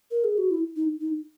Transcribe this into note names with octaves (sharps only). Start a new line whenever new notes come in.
A#4
G#4
F#4
E4
D#4
D#4